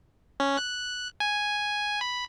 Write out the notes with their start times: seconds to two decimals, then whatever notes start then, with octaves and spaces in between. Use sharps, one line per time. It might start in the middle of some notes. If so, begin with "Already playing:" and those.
0.40 C#4
0.58 F#6
1.20 G#5
2.01 B5